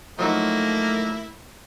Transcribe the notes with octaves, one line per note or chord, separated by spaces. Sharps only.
F3 F#3 A3 A#3 D#4 E4